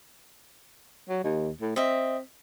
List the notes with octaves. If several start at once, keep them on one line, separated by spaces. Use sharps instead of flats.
F#3
D#2
A2
C4 D#5 E5